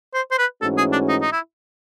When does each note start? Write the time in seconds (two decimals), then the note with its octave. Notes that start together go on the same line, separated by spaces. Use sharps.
0.14 C5
0.31 C5
0.38 B4
0.61 G#2 E3 A3 C#4 F#4 A4
0.78 G#4
0.92 D4
1.08 D#4
1.21 D#4
1.32 E4